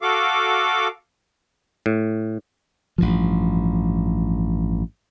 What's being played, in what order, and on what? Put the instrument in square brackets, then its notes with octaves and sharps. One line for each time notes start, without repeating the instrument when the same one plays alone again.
[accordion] F#4 A4 F5 D6
[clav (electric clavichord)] A2
[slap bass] A1 G2 F3